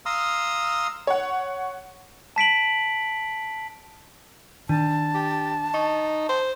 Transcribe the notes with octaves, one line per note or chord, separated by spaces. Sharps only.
F5 A#5 C6 D#6 E6
C#5 F#5
A5 B6 D7 F#7
D#3 D4 A5
G4
D#4 C#6
C5